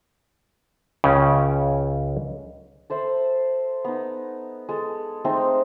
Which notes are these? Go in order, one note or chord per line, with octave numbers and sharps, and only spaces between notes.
C#2 C#3 C#4 G5
A4 C5 E5 B5
B3 D#4
G#3 A4
G#3 A3 C4 D#4